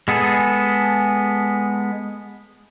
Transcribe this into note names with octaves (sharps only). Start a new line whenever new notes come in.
G#3 B3 G#4 A4